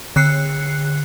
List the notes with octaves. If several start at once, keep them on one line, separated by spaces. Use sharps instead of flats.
D3 F#6 C7 C#7